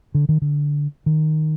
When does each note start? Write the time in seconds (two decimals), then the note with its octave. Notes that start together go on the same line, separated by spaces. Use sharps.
0.15 D3
0.29 D#3
0.42 D3
1.06 D#3